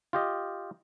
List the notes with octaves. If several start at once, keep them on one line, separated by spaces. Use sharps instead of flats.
F4 G4 D#5